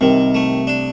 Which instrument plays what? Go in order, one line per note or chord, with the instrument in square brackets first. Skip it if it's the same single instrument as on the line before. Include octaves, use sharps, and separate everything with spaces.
[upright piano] C2 C3 [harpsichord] D#3
[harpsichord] A3
D4